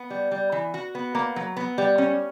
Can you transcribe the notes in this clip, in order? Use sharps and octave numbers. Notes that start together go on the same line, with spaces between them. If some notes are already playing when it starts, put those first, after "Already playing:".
Already playing: B3
G3
G3
E3
F#4
B3
A#3
F#3
B3
G3
C#4